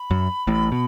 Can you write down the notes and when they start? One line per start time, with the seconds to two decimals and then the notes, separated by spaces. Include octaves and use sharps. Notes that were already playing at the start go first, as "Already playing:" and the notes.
Already playing: B5
0.11 F#2
0.47 A1 A2
0.72 B2